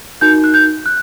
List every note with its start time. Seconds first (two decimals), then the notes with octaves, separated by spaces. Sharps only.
0.21 D#4 F#4 A#4 G6
0.44 F#6
0.54 G6
0.86 F#6